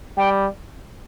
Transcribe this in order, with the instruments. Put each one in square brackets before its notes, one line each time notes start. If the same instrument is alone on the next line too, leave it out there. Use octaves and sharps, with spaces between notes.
[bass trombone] G3 [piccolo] G5